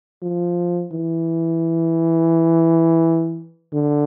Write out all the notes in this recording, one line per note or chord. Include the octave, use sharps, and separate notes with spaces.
F3
E3
D3